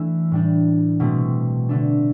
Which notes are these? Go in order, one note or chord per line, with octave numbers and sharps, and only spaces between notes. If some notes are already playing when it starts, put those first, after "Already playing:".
Already playing: E3 A3 D4 E4 A4
A2 G3 D4
B2 A3 C4
D3 A3 D4